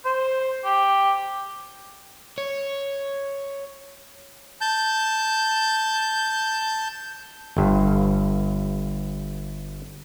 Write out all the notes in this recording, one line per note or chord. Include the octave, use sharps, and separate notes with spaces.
C5
G4
C#5
A5 G6
G1 G2